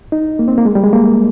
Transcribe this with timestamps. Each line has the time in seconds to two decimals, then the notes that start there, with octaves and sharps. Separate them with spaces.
0.12 D#4
0.39 A#3
0.48 C4
0.58 A#3
0.65 G#3
0.75 G3
0.84 G#3
0.93 A#3